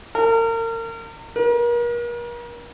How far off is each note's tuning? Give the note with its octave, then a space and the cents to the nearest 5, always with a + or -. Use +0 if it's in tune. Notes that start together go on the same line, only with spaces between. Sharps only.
A#4 -35
A#4 +40